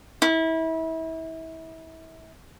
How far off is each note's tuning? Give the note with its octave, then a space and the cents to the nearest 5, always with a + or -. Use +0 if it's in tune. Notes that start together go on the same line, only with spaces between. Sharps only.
E4 -30